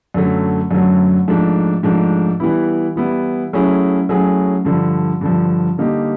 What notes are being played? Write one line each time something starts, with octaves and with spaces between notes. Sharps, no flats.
F#2 D3 F#3 A3
F#2 D3 F#3 A3
G#2 F3 A3 D4
G#2 F3 A3 D4
E3 G3 B3 E4
E3 G3 B3 E4
F#3 A3 C#4 E4 G#4
F#3 A3 C#4 E4 G#4
G2 D3 F3
G2 D3 F3
D3 G3 A#3 D#4 G4